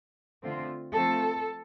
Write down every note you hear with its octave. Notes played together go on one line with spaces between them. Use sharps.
D3 A3 C4 F4
F3 A3 C4 F4 A4